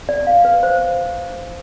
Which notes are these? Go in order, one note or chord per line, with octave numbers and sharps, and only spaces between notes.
D5
F5
B4
C5